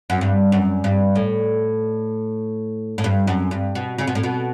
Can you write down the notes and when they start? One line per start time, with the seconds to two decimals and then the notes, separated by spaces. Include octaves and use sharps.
0.10 F#2
0.21 G2
0.52 F#2
0.84 G2
1.15 A2
2.98 A2
3.04 G2
3.27 F#2
3.51 G2
3.75 B2
3.98 C#3
4.07 B2
4.15 A2
4.23 B2